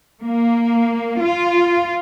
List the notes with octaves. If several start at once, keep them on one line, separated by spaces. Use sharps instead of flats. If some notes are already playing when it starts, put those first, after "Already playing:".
A#3
F4